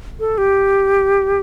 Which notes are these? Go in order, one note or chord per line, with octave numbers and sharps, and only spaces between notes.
A4
G4